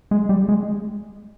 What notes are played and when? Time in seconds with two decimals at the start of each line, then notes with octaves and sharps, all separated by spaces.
0.11 G#3
0.29 G3
0.49 G#3